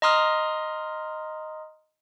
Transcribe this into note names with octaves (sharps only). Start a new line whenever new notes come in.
D#5 A#5 C6 D#6 F6